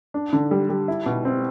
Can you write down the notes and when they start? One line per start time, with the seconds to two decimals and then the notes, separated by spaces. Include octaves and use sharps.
0.14 D4
0.33 D3
0.51 G3
0.69 G3
0.88 E4
1.06 B2
1.25 C4